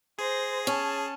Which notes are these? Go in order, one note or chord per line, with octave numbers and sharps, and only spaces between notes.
G#4 C5 A#6
C#4 A5